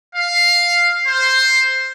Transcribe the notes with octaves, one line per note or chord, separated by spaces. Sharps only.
F5
C5